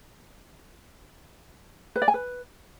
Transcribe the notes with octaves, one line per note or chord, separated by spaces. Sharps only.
B4
D5
G#5
B4